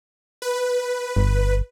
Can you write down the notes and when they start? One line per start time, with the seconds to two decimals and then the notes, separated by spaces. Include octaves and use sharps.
0.42 B4
1.16 G1